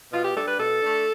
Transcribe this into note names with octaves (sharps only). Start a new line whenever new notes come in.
B2 F4
G4
G3 D4 A4
B4
B2 A4
A3 D4